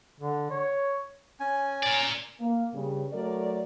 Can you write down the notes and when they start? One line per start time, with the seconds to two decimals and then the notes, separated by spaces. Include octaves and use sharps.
0.20 D3
0.51 C#5
1.40 C#4 G#5
1.83 A#4 D5
2.40 A#3
2.74 G2 C#3
3.13 F#3 A3 A#4 D5